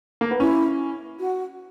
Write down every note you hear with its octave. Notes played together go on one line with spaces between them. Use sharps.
A#3
B3
C#4 E4
F#4